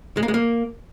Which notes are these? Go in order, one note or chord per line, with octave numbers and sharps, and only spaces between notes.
G#3
A#3
G#3
A#3